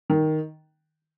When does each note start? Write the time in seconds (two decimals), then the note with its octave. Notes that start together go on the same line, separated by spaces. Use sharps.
0.10 D#3